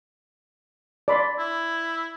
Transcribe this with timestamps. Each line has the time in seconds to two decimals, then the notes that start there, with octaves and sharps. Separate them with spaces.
1.08 D5 B5 C6
1.39 E4